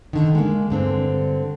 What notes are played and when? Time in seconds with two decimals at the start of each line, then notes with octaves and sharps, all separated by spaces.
0.13 D3 D#3
0.35 G#3 A#3
0.70 G2 D3 C4